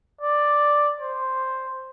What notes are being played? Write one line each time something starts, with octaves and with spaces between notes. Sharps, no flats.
D5
C5